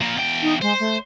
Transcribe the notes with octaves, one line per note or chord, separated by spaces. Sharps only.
F3 A#3
E2 G5
D#4
G#3 C5
A3